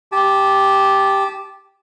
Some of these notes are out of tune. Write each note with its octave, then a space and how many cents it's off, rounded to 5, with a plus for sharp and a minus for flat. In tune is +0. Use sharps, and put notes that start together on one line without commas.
G4 +0 A5 -25